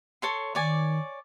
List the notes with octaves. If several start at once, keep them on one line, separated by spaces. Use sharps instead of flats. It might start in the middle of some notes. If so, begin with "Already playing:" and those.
A4 C#5 C6
D#3 C#5 D5 G#5